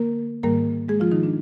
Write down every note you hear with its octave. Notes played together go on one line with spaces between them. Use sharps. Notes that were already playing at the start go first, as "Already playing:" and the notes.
Already playing: D3 A#3 A#4
G#2 D#3 G3 A#3 A#4
G#3 G#4
F3 F4
D#3 D#4
D4